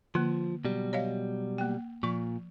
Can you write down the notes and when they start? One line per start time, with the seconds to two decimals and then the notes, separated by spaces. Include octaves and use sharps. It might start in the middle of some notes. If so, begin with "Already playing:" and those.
0.15 D3 F3 A#3
0.65 B2 F#3 G3
0.93 C#5 D#5 F5
1.58 A#3 G5
2.03 A#2 F3 C#6